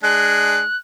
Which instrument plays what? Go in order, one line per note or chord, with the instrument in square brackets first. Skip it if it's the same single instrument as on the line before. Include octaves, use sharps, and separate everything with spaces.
[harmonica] G#3 D4 [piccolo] F#6